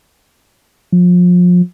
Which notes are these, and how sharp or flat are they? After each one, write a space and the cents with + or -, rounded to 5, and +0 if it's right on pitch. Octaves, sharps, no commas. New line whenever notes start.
F3 +30